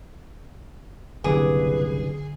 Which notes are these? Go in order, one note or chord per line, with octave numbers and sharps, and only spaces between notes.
F#1 C2 G2 D3 G#4 B4 D6 D7